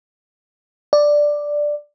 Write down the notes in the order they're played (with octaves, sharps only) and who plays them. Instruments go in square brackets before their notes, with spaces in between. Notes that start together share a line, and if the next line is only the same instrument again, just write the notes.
[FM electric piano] D5